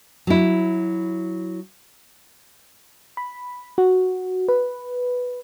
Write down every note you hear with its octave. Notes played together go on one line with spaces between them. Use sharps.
F#3 E4
B5
F#4
B4